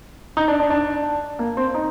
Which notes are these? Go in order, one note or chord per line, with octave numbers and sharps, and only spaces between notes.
D#4
D4
D4
D4
A#3
C4
D#4